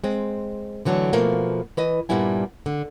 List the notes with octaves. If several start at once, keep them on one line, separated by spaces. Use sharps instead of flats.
G#3 C4
D3 E3 F#3 A3 D4
B2 F3 A3 A#3
E3 B4 D#5
G2 A#2 G3 B3 E4 G#5
D3